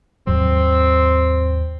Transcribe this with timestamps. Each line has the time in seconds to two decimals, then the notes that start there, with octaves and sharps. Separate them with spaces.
0.27 D#2 G#2 F#3 C4